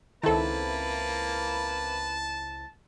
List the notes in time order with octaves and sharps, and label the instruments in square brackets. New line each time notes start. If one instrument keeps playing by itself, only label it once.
[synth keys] C#2 C4 E4 [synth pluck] D#3 A4 [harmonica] A#3 B4 [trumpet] A5